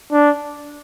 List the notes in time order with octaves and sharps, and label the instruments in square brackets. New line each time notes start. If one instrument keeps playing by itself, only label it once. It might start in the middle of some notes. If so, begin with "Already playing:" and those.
[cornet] D4